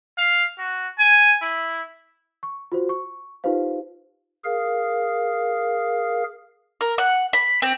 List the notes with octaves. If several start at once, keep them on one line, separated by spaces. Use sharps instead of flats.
F5
F#4
G#5
E4
C#6
F4 F#4 C5
C#6
D#4 F4 G4 B4 C5 F5
G#4 A#4 F5
A#4
F#5
B5
C4